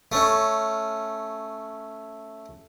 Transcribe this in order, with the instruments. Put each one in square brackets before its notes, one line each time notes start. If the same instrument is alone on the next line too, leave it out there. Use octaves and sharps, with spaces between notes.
[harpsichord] A3 C#4